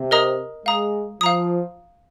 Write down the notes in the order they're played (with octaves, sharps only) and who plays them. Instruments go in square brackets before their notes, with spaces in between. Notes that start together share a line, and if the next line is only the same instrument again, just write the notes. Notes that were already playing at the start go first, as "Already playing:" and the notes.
Already playing: [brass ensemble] C3
[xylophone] A#4 D#5 A#5 D#6
[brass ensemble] G#3 [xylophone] F5 A#5 D#6
[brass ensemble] F3 [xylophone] F5 A#5 D#6